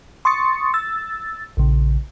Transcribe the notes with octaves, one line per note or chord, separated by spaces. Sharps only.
C6 C#6 D#6 A6 C#7
E6 A6
A#1 C#3